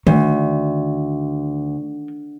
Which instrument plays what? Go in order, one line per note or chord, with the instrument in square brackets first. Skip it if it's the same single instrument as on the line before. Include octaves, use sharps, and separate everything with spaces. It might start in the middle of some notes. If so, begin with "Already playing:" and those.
[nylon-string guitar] D2 [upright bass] D#3